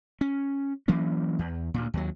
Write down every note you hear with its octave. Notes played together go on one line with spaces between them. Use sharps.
C#4
E3 F#3 A#3 C#4
E2
D2 A#2
D#2 F#3